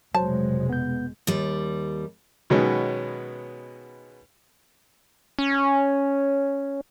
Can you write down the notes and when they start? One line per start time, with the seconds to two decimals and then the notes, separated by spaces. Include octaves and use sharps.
0.15 F1 B2 F#3 G#3 C5 A5
0.69 B3 G6
1.27 D#2 G3
2.50 B2 D#3 F#3 G#3 B3 C#4
5.39 C#4